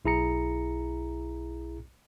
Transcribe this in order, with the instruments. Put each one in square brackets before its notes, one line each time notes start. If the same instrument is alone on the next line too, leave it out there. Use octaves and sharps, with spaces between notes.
[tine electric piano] B1 E4 G#4 A#5 C#7